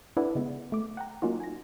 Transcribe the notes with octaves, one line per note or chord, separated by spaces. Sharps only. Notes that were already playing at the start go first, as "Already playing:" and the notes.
D4 E4 A4 B4 D5 F#5
C#3 G#3 B3
A3 D6
F#5 G5 A#5
F#3 A#3 C#4 D#4 F4 F#4
G#5 A#6